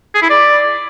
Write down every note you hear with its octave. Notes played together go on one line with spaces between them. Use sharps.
G#4
E4
D5